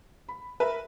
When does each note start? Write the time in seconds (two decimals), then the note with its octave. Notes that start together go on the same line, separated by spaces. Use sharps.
0.29 B5
0.60 A#4 B4 E5